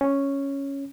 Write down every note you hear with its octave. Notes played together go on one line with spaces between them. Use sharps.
C#4